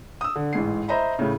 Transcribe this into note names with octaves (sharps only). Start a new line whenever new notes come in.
D#6 E6
D3
A1 G#2 C7
C5 D#5 E5 A#5 B5
A2 C#3